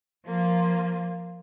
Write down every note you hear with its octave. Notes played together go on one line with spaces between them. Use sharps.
F3 A#3 F4